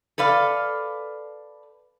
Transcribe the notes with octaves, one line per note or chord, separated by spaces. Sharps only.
A4 B4 D5 F5